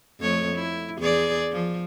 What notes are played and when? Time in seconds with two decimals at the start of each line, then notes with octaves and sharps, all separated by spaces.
0.20 F2 A3 C#5
0.55 E4
0.99 E2 G#4 D5
1.52 F3